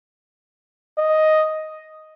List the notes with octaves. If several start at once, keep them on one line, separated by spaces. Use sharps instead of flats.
D#5